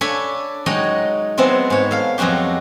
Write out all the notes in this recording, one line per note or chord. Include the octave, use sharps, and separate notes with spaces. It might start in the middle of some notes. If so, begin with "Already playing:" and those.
D4 A4 C#5 G#5 B5
F#3 G#3 D#4 C#5 D#5 G5
F#3 G#3 B3 C4 E4
G#2 C#5
A4 F5
F2 F#3 G#3 F#4 G4